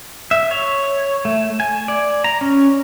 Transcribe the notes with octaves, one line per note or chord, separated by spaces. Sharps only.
E5
C#5
A3
G#5
D5
A#5
C#4